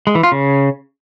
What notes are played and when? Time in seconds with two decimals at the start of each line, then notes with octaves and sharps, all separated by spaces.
0.07 G#3
0.15 E3
0.23 F4
0.32 C#3